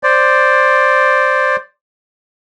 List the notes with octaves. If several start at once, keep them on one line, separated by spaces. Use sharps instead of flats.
C5 D5